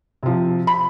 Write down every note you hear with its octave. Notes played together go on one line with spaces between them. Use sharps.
C3 F3
B5